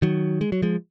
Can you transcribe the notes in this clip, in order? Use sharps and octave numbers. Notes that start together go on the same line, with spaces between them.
D#3 F#3
G#3
F#3
F3 G#3